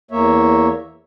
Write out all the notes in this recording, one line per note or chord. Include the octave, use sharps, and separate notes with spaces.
E2 A#3 C#5 E5